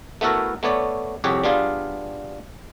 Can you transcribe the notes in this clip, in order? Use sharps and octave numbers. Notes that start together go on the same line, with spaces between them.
A3 B3 E4 F#4 A4 A#4
A3 B3 C#5 D5
C2 F2 G4 G#4 C#5 F#5
G3 B3 D4 F4 G#4 F5